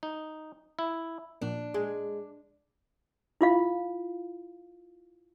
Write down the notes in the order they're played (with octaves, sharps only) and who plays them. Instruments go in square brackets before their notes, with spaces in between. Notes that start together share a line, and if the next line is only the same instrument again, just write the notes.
[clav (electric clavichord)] D#4
E4
[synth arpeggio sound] A#2 F3 A#3 [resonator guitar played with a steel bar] D4
[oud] G#3
[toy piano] E4 F4 F5